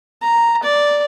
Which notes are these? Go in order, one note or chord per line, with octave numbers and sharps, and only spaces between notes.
A#5
D5